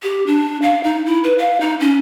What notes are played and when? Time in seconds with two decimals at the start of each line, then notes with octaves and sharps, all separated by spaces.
0.03 G4
0.27 D4
0.62 F5
0.84 D#4
1.06 E4
1.24 B4
1.39 F5
1.61 D#4
1.80 C#4